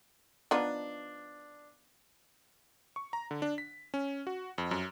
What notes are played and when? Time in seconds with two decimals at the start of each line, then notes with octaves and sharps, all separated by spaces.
0.51 F3 B3 D4 D#4
2.96 C#6
3.13 A#5
3.31 D3
3.42 D4
3.58 B6
3.94 C#4
4.27 F#4
4.58 F2
4.71 F#2